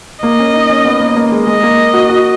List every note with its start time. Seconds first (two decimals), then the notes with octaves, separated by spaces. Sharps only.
0.22 A#3 D#5
0.39 C#4
0.54 D#4
0.69 C#4
0.85 B3
1.00 A#3
1.16 A#3
1.31 G#3
1.47 G#3 D#5
1.63 A#3
1.94 F#4
2.09 F#4